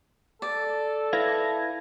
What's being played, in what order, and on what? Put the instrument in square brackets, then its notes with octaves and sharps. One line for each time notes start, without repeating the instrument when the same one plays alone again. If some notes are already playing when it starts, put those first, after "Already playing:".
[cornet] A4 [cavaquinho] D5
[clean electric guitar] E4 B4 F5 [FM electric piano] G#6 A#6